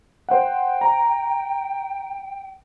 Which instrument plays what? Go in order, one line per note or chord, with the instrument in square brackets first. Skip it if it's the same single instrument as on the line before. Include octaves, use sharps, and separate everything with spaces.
[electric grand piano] C5 F#5 [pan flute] G5
[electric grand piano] A#5